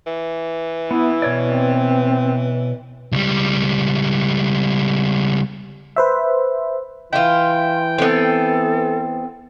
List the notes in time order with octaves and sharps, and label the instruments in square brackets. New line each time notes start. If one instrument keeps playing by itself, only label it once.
[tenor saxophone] E3
[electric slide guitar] B3 [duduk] E4
[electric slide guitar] B2 C#5 D5
[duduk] C4
[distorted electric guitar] C#2 G3
[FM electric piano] B4 C5 E5
[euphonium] E3 [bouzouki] E4 F4 [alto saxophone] G5 [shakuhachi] C6
[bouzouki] B3 C4 [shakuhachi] A4